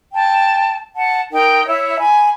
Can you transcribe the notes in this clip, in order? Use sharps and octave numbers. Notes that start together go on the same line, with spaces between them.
G5 A5
F#5 A5
D#4 A#4 G5
E4 C#5 E5
G#5 B5